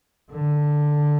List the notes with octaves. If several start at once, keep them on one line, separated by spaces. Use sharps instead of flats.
D3